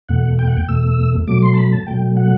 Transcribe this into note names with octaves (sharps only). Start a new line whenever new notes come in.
E2 B2 A3 F#5
G5
F#5
G5
E2 B2 A3 E6
B2 F#3 A3 D6
C6
A5
B5
A5
B2 F#3 A3 G5
F#5